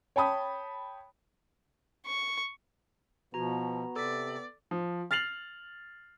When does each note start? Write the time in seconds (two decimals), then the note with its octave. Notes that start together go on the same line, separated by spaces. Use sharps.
0.16 C#5 G5 A5 B5 D#6
2.06 C#6
3.34 B2 F3 B3 F#4 A#5
3.96 C3 A4 D5 B6
4.71 F3
5.11 F6 A6 C7 F7 F#7